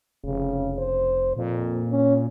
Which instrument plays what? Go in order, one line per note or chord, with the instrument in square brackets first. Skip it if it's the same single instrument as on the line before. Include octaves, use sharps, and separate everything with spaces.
[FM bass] F1 [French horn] C#3
[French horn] C5
[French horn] F2 [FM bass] A#2
[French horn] C#4